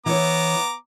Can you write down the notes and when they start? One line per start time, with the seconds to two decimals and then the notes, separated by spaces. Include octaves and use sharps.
0.06 E3 B3 C#5 A#5 D6